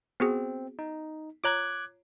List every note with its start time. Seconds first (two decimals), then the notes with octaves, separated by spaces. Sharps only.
0.20 B3 C4 F#4 G#4
0.79 D#4
1.44 F4 C#5 A#5 D6 F#6 G#6